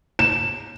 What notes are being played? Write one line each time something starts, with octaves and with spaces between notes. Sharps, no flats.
E7